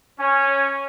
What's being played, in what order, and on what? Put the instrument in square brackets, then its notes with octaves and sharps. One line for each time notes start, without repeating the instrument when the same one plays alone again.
[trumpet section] C#4